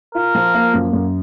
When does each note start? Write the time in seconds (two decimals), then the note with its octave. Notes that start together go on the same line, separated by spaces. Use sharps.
0.15 F4 A#4
0.35 F3
0.54 A#3
0.74 F#2
0.93 F#2